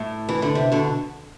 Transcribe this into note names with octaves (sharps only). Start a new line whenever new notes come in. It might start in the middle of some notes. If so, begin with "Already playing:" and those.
Already playing: A2
E3
D3
C3
B2 D3